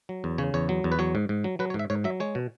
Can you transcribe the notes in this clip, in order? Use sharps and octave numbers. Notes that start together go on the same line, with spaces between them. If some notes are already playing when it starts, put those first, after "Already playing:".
F#3
E2
C#3 C#5
E2 C#5
F#3
E2
B4
F#3 C#5
G#2
G#2
F#3
F#3 B4
C#5
G#2
E5
G#2 C#5
F#3 E5
G#3 C#5
B2